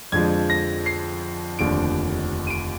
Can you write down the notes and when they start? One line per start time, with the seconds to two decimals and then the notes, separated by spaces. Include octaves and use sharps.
0.12 F2 D3 F3 G#3 G#6
0.50 A#6
0.86 C7
1.59 F1 D#2 D3 F3 D7
2.47 D#7
2.50 D7